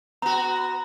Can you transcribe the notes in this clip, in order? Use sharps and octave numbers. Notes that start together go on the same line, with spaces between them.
B3 F#4 A#5